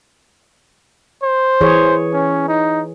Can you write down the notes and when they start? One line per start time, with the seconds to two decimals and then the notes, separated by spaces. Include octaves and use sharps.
1.23 C5
1.61 E3 G#4 C#5
2.13 C#4
2.48 D#4